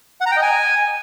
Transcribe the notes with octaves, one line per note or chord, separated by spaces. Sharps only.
F#5
A#5
G5
D#5
G#5